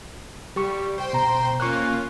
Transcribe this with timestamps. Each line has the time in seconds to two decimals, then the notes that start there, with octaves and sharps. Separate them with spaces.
0.56 G3 G4 C#6
0.98 C5 G5 C6
1.13 B2 A#5
1.60 A#3 C#4 F4 C#6 F#6